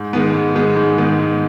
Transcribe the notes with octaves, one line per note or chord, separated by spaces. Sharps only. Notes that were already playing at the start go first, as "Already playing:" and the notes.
Already playing: G#2
D#3 G#3 B3
G#2
D#3 G#3 B3
G#2
D#3 G#3 B3
G#2